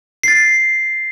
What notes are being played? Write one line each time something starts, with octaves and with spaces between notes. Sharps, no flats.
A6 C7